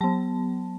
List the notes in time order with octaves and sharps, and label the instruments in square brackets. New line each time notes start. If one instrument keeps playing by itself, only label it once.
[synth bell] F#3 B3 A5